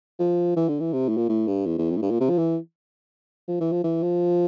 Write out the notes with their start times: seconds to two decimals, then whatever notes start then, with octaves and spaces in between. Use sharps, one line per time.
0.19 F3
0.56 E3
0.69 D3
0.80 E3
0.93 C3
1.09 A2
1.17 A#2
1.29 A2
1.48 G2
1.66 E2
1.78 E2
1.90 F2
1.97 A2
2.02 G2
2.11 A#2
2.20 C3
2.29 F3
2.38 E3
3.48 F3
3.60 E3
3.72 F3
3.84 E3
4.03 F3